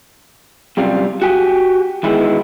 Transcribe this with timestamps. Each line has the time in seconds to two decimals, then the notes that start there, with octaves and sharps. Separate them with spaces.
0.77 F#2 C3 G3 F4
1.22 F#4 G4 G#5
2.04 D#3 E3 G#3 B3 D#4 E4